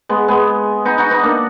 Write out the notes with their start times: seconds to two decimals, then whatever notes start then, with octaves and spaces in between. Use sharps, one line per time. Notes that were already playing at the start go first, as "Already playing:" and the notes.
0.09 G#3 B3
0.28 G#3 B3
0.85 B3 D#4
0.98 D#4 F#4
1.11 B3 D#4
1.23 A#3 D4